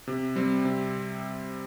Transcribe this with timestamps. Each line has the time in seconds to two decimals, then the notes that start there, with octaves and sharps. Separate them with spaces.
0.07 C3
0.36 G3 C4
0.65 C3